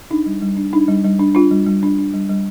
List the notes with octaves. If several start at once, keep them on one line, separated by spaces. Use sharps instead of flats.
D4 D#4
G3
G3
D4
D4 D#4
G3
G3
D4
D4 F4
G3
G3
D4
D4
G3
G3